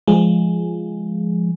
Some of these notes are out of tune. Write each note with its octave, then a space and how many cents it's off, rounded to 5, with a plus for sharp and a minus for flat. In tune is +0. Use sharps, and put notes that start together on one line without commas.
F3 -10 G#3 +0